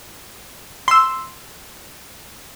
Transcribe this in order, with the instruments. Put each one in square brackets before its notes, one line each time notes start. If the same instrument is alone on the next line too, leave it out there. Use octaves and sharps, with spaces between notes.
[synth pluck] C6 E6